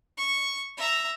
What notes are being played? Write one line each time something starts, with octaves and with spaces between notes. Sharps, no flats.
C#6
E5 A#5